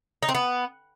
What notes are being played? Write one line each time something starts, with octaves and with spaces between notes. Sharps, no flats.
D#4
C4
B3